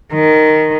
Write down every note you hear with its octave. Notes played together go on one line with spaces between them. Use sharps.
D#3